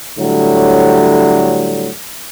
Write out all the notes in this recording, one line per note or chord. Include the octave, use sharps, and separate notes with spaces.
A2 D3 F#3 G3